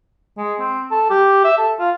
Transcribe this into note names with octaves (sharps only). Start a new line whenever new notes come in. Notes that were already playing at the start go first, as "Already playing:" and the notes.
G#3
C4
A4
G4
E5
A4
F4